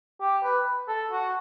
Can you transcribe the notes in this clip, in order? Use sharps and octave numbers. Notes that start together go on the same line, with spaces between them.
G4
B4
A4
F#4